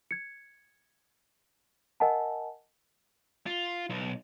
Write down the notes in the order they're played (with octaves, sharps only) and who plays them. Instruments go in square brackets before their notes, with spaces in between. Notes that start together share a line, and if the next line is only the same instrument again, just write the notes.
[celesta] G#6 C#7
A#4 D#5 F#5 G#5 A5
[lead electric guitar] F4
B1